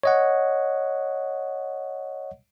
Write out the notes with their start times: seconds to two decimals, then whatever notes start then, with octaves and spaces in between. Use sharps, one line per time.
0.03 C#5 D#5 F#5